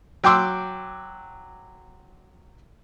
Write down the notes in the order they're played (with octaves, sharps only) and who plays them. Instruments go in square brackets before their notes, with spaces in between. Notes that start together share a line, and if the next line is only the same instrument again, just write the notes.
[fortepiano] F#3 G5 C6 D6 E6